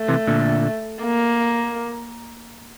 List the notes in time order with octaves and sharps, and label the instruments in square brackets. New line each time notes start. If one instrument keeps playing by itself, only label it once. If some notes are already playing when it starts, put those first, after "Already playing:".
Already playing: [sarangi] A3
[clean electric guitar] C3 E3
A#2 D3
[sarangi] A#3